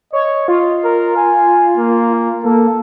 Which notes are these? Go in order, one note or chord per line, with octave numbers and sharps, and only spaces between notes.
C#5 D#5
F4
A#4
G#5
A#3
A#3 A4